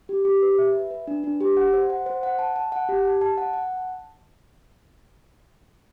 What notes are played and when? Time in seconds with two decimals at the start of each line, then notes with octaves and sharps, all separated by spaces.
0.09 G4
0.25 G4
0.42 B4
0.58 E5
0.75 B4
0.91 B4
1.07 D4
1.24 D4
1.41 G4
1.57 F#5
1.74 C5
1.90 F#5
2.06 C5
2.23 F#5
2.39 A5
2.56 A5
2.72 F#5
2.89 G4
3.05 A5
3.21 A5
3.38 F#5
3.53 F#5
3.70 A5